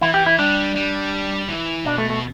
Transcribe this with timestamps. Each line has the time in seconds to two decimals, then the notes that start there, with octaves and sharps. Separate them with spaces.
0.01 E3 E4
0.14 G4
0.26 E4
0.38 G3 D4
0.75 G3
1.49 E3
1.85 B2 D4
1.98 A3
2.10 A3